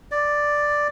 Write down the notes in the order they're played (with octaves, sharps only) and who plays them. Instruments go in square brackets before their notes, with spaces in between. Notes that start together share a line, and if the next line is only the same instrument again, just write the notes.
[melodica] D5